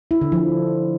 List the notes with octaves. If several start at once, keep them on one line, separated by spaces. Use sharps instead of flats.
E4
D3
F3